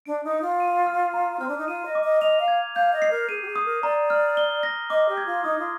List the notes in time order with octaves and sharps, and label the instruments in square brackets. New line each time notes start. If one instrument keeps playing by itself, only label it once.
[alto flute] D4 [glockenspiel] D7
[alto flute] D#4
[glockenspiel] D#6
[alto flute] F4
[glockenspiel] D#7
F6
A#5
[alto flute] C4 [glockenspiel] F6
[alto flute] D4
D#4
[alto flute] F4 [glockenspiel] D#7
[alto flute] D#5
[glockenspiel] D6
[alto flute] D#5
[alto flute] D#5 [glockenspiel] F7
[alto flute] F5
[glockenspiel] G#6
[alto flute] F5 [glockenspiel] G6
[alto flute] D#5
[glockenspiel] C7
[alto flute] A#4
[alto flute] G#4 [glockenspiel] D#7
[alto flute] G4
G#4
[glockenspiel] D#6
[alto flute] A#4
[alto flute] D5 [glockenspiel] A#5
[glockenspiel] F6
G7
A#6
[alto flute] D#5 [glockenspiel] D6
[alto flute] G4
[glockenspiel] G#6
[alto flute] F4
[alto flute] D#4 [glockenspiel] D#6
[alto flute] F4